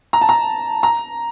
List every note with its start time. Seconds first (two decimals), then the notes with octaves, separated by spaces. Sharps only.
0.13 A#5
0.21 A5
0.29 A#5
0.83 A#5